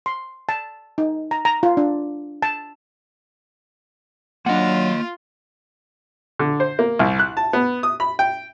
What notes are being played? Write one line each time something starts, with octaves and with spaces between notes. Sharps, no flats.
C6
A5
D#4
A#5
A#5
F4
D4
A5
F#3 A#3 D4 F4 D#5 F#5
D3
C5
A#3
C2
F#6
A5
B3
D#6
B5
G5